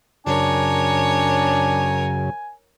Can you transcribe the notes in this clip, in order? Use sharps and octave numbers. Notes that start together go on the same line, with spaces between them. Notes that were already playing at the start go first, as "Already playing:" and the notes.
F#2 C#3 D4 A#4 C#5 G#5